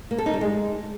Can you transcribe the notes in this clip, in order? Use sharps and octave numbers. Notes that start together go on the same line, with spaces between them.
A#3
A4
D#4
G3
G#3